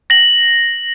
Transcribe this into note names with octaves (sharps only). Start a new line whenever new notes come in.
A#6 F#7